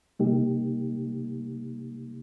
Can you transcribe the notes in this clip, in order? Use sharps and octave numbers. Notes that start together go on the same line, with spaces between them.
C3 G3 A#3 D#4 G4